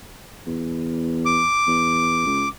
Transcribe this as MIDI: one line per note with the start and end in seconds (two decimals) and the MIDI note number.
0.47 1.44 40
1.26 2.48 86
1.67 2.24 40
2.26 2.46 37